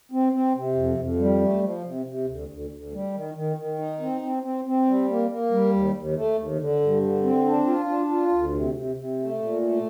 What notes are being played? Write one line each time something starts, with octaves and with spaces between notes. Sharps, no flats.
C4
C4
C3
F2
F2
G3
A3
F3
C3
C3
D2
D2
D2
G3
D#3
D#3
D#3
D#4
C4
C4
C4
C4
G3
A#3
A#3
G3
D#2
D#2
A3
D#2
D3
G2
D3
C4
D4
F4
D4
F4
D2
C3
C3
C3
A3
A#2
A3